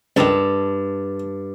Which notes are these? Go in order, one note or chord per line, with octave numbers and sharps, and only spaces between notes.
C#2 G2 D#3 A4